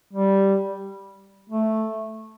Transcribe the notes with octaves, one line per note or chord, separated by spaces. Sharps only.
G3
A3